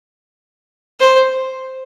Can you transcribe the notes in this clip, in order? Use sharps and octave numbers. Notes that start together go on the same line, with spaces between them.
C5